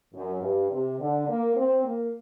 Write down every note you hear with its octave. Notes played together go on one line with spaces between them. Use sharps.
F#2
G2
C3
D3
A#3
C4
A#3